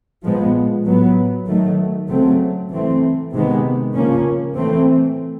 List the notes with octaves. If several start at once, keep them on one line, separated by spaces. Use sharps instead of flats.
A#2 F3 G#3 B3
A2 F#3 B3
D#3 F#3 A3
C#3 F#3 A3 C4
E3 A3 C4
C3 D#3 G#3 B3
C#3 F3 A#3 C#4
E3 A3 C4